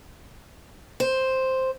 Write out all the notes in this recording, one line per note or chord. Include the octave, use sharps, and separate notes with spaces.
C5